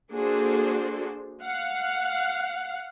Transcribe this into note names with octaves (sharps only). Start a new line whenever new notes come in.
A#3 D4 F#4 G#4 A4 C5
F5 F#5